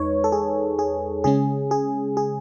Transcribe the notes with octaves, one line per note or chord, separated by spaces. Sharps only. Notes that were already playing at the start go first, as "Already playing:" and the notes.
Already playing: E2 G#3 D#4 B4 C#5
A4
G#4
G#4
C#3 G#3 C#4 G#4
G#4
G#4